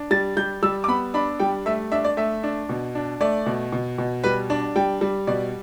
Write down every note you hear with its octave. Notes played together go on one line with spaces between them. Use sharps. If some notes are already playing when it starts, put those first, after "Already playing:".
Already playing: D4
G3 A6
G3 G6
G3 E6
D6
B3 B5
D4 B5
G3 G5
A3 E5
D4 E5
D5
A3 E5
D4
B2
D4
A3 D5
B2
B2
B2
G3 B4
D4 D5
G3 G5
G3
B2 D5